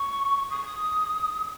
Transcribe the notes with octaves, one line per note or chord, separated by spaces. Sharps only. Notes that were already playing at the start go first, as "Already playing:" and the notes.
Already playing: C#6
D#6